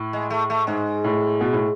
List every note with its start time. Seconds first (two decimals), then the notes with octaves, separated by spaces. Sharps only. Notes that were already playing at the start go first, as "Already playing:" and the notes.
Already playing: A2
0.13 G#3
0.30 A3
0.50 A3
0.67 G#2 G#3
1.04 A2
1.41 B2
1.53 A2